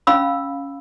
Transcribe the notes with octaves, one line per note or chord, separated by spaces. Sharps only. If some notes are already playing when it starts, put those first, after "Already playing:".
C#4 F5 B5 E6